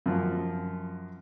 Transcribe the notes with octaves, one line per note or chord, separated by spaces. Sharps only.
F#2 F3